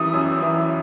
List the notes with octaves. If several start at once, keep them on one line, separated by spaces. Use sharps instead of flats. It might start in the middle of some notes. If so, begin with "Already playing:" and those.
Already playing: E3 G3 D#6 E6
F#2
E3